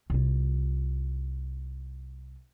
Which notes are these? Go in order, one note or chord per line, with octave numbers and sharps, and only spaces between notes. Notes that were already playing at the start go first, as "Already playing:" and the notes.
C2 F4